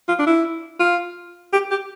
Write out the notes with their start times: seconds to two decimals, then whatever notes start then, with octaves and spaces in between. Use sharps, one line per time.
0.08 F4
0.19 D4
0.27 E4
0.80 F4
1.53 G4
1.71 G4